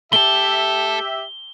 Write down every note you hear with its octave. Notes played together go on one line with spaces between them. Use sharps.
A3 G4 A4 E5 G7